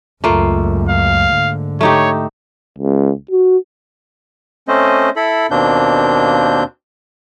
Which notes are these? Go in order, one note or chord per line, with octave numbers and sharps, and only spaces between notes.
C#2 F#2 A3 A#3 F4
F5
G#2 D3
A3 D#4 G4 C#5
C#2
F#4
A3 C4 C#4 C5 D#5
E4 A4 B5
D#2 B2 A#3 C4 D4 G6